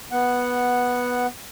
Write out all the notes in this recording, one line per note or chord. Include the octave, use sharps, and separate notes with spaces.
B3 F#5